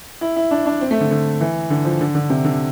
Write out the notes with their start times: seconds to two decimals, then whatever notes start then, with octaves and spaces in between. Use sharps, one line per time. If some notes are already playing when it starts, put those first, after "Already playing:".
0.21 E4
0.36 E4
0.51 D4
0.66 D4
0.81 C4
0.91 A3
1.01 D3
1.11 D3
1.40 E3
1.70 D3
1.85 F3
2.01 D3
2.15 D3
2.30 C3
2.45 D3